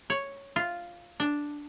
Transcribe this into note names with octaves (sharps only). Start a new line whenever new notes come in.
C#5
F4
D4